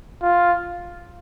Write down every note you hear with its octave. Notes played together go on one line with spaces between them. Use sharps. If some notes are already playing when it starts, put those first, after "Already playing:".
F4